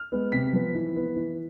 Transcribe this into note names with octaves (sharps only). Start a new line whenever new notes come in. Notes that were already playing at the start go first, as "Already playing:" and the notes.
Already playing: F6
G#3 B3
C3 B6
F3 B3
E3
B3
E3